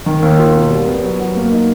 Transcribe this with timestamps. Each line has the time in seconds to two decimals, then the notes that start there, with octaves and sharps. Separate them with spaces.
0.06 D#3
0.22 D#2
0.39 F4
0.55 B2
0.71 G3
0.87 B3
1.03 F#3
1.19 F#3
1.35 A#3
1.52 D#4